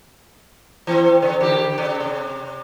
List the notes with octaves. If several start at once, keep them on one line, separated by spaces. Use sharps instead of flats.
E3 C4
C#3
D3 G4
C#3
C3